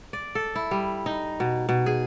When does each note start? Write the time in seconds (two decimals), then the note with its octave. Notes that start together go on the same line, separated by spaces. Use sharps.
0.13 D5
0.35 A4
0.56 E4
0.71 G3
1.06 D#4
1.40 B2
1.69 B2
1.86 G#4